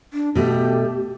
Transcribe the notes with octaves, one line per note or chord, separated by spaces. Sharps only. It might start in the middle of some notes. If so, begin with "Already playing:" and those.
D4
B2 A3 G4